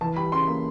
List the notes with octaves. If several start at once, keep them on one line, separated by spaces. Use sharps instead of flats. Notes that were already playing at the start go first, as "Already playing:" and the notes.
E3 A5
G3 B5
C#3 C6
A#3